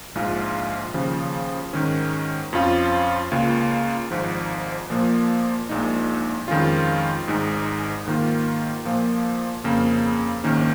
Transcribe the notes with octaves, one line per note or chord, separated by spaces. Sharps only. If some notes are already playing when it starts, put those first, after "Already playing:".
A#1 G#2 G#3 F4
D#2 C#3 F3
G#2 D#3 G#3 C#4
F2 F3 C#4 F4
C#2 C#3 A#3 F4
G#1 G#2 F3
A#2 F3 A#3
A#1 A#2 G#3 D#4
F2 D#3 G#3 C#4 F4
G#1 G#2 G#3 D#4
G#2 D#3 A#3 F4
A#2 F3 A#3
F2 C#3 A#3
A#1 G#2 D#3 A#3 C#4